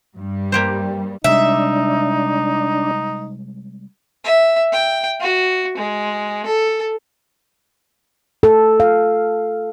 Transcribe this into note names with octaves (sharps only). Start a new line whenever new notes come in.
G2 G3
A#3 G4 C5
C3 G3 G#3 D4 D#4 E5
E5
G5
F#4
G#3
A4
A4
F5